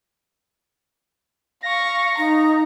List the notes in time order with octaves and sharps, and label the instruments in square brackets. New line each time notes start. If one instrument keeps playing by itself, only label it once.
[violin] F5 C#6 [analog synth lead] A#6
[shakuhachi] D#4 [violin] A#5